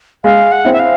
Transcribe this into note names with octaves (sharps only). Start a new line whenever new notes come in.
G#3 F5
F#5
C4 E4
E5
F5